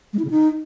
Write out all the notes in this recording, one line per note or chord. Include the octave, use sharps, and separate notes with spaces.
G#3
E4
C#3
D#4